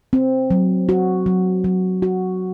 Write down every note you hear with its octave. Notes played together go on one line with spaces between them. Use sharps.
C4
F#3
F#4
F#3
F#3
F#4